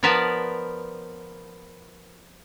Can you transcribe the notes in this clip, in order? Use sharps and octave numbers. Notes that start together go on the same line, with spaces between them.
F3 B3 A#4 B4 D5 A5